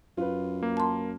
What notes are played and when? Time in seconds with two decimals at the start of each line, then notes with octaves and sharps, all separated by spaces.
0.17 F#2 F4 B4
0.63 A#3
0.77 A5 C6